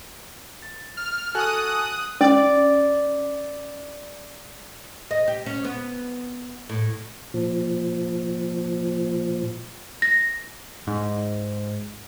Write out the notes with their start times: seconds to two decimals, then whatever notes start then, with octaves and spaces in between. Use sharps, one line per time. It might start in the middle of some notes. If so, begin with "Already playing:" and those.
0.62 A6
0.97 F6
1.35 F#4 A4 G#5 D#6 F#6
2.21 C#4 D5
5.11 D#5
5.28 G4
5.46 C#4
5.64 B3
6.69 A2
7.34 A#2 F3
10.02 A#6
10.87 G#2